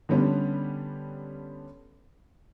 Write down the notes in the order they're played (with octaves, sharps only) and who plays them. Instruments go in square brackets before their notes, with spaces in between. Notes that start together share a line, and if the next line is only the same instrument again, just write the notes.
[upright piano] D3 G3 B3 C#4 D4